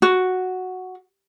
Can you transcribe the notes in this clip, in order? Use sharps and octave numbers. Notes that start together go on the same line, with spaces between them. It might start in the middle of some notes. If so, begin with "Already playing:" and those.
F#4